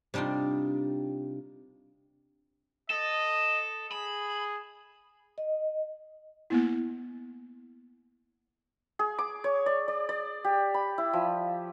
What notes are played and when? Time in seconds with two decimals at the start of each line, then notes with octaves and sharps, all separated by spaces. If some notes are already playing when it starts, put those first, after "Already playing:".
0.14 C3 G3 D4 D#4 F4
2.90 A4 D#5
3.92 G#4 B5
5.38 D#5
6.50 A#3 B3 E4
8.99 G#4
9.18 D6
9.44 C#5
9.66 D5
9.88 D5
10.09 D5
10.44 G4
10.74 B5
10.98 E4
11.13 F3